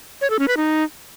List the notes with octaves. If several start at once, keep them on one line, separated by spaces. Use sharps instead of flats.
C#5
A4
C#4
B4
D#4